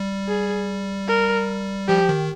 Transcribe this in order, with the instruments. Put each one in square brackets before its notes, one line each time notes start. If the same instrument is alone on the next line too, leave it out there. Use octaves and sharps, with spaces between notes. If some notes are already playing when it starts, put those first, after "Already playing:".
Already playing: [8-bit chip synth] G3
[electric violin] G#4
A#4
[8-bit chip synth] F3 [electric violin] G4
[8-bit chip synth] D#3